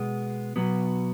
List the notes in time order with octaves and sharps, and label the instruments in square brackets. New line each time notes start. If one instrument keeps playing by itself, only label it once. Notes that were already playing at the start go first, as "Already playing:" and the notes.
Already playing: [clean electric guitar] B2 G#3 B3
B2 F#3 B3